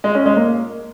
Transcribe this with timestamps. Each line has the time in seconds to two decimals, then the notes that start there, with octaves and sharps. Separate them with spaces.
0.04 G#3
0.15 C#4
0.26 G#3
0.36 A#3